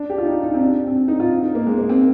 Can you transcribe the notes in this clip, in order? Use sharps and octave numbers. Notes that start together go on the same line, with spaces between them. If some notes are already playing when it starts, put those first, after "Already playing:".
Already playing: D4
G4
F4
D#4
D#4
C4
D4
C4
D#4
F4
D#4
A#3
G#3
A#3
C4